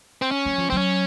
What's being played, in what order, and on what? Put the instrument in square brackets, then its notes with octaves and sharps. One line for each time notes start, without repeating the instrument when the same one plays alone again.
[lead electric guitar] C4
C#4
[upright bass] F#3
F3
[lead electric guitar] C4
[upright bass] F#3 [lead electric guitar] C#4